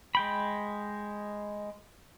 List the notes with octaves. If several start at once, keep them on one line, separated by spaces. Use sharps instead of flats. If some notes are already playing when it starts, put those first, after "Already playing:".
G#3 G5 B5